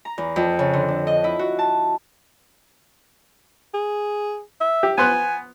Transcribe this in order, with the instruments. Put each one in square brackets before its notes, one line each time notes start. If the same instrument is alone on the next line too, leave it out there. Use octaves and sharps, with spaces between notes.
[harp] A#5
E2
F2
C#3
D3
D4
D#5
E4
F#4
A5
[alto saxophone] G#4
E5
[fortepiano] G4
[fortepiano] B3 C6 F#6 [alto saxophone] G#5